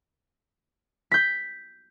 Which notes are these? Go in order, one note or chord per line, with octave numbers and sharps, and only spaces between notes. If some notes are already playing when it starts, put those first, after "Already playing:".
G6 B6